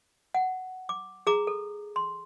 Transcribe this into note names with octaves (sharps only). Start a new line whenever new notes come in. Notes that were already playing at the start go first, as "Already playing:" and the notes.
F#5
D6
G#4 A#5 D6
A4
C6